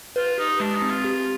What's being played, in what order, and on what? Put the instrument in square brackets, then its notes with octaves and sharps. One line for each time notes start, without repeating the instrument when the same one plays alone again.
[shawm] F4 [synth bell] B4
[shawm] D#4 [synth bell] G4
[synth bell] G#3 [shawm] D4
[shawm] D#4
[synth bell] C4
[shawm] F4
[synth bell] G4